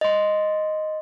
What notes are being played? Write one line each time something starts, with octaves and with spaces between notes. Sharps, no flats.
D#5 C6